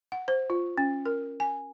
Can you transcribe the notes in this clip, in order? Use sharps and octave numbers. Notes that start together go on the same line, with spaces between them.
F#5
C5
F4
C#4
A#4
G#5